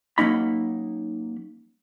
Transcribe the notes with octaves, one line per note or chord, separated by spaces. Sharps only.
F#3 A#3 C#4 D#4 B5